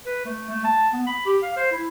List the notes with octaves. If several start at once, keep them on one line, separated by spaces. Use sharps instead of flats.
B4
A3
A3
A5
B3
B5
G4
F5
C5
E4